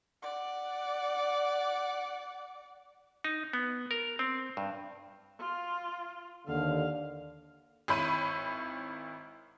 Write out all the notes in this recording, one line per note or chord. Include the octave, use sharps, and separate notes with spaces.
D5 F#5
D#4
B3
A#4
C4
G2
F4
D#2 D3 F5
G#1 E4 C#5 B5 G6 D#7